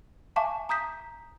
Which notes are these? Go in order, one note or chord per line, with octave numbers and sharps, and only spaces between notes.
E5 F5 G#5 A5 C#6 D6
A#5 D#6 G6 B6